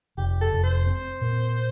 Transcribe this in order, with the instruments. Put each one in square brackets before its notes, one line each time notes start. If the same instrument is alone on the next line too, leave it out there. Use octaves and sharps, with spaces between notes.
[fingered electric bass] F1 [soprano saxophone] G4
[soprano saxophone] A4
[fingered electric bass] F1
[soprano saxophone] C5
[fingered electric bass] C4
A#2